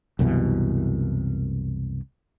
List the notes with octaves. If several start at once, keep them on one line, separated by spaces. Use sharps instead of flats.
C2 F#2 B2 E3